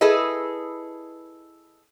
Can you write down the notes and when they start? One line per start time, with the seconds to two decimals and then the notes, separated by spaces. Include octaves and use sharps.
0.01 E4 G#4 A4 B4 D#5